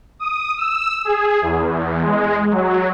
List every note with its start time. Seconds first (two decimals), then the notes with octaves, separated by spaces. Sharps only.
0.19 D#6
0.57 E6
1.05 G#4
1.42 E2
2.02 G#3
2.51 F#3